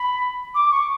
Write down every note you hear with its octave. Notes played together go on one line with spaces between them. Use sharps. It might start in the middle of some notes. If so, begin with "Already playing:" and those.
Already playing: B5
D6
C#6